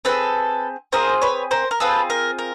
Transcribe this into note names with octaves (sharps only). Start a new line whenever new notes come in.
C4 F4 G#4 A4 B4
C4 F4 G#4 A#4 C5
B4 C#5
A#4 C5
A#4
C4 F4 G#4 A4 B4
A#4
A#4